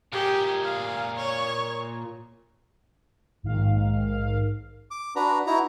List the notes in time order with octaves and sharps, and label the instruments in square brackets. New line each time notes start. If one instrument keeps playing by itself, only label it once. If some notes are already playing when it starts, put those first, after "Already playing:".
[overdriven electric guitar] A#2 G#4 [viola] G4
[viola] F5
C#5
[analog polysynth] A#1 G#2 D#3 F5
[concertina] D6
D4 F#4 B4 A#5
D#4 E4 F#4 A#5